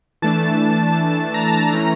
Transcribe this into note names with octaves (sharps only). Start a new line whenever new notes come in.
E3 A3 D4 A5
A#5
A#5
E3 A3 C#4